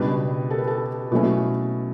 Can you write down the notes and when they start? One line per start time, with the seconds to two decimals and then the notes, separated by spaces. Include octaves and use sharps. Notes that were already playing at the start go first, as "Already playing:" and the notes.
Already playing: C#2 B2 G3 D4 B4
0.50 A4
0.58 B4
0.67 A4
1.11 B2 F#3 A3 C#4 E4